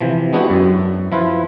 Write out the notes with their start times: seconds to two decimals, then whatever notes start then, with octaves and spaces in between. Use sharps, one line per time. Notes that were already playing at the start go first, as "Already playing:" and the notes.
0.01 C3 E3 F3
0.33 G#3 B3 D4 E4 F#4 G4
0.50 F#2
1.12 F3 E4 F4 B4